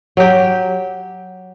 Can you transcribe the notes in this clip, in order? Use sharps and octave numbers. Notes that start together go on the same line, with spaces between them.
F#3 G4